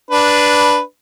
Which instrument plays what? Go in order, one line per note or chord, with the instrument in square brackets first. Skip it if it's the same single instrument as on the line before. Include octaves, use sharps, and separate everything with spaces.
[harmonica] D4 B4